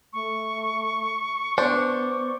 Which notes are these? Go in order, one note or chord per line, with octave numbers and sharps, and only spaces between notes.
A3 C#6
B3 D4 C5 D5